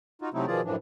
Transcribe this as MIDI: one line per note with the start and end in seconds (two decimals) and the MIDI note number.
0.22 0.29 63
0.22 0.29 65
0.22 0.29 66
0.34 0.46 48
0.34 0.46 54
0.34 0.46 57
0.34 0.46 60
0.34 0.46 63
0.34 0.46 64
0.47 0.61 47
0.47 0.61 51
0.47 0.61 53
0.47 0.61 65
0.47 0.61 68
0.47 0.61 74
0.64 0.76 42
0.64 0.76 45
0.64 0.76 52
0.64 0.76 53
0.64 0.76 62